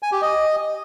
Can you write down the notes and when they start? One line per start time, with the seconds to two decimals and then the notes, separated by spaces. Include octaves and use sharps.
0.03 G#5
0.12 G4
0.22 D#5